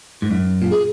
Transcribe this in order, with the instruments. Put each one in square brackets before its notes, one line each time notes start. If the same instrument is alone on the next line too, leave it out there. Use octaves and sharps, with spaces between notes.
[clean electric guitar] G#2
F#2
A#2
[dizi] G#4